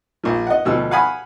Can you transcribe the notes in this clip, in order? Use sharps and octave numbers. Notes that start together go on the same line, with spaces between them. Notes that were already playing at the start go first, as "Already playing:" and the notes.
A#1 F3
D#5 F#5
D2 B2 F3 E6
F5 F#5 G#5 B5 D#6